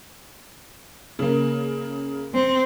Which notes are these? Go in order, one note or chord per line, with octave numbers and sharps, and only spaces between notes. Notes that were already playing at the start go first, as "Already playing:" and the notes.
C#3 A#3
C4